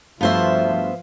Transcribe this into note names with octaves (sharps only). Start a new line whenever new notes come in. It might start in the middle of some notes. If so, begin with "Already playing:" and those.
G2 F3 A3 B3 F#4 C5 E5 F5